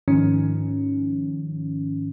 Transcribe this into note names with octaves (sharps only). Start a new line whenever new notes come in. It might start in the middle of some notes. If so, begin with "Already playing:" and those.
G#2 D#3 F3 C#4